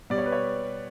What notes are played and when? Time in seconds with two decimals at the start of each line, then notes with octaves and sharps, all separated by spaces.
0.10 B2 G3 B3 D5
0.18 C#5
0.26 B4
0.32 C#5